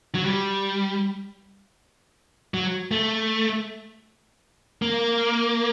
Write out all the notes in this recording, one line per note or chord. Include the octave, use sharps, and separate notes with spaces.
F#3
G3
F#3
A3
A#3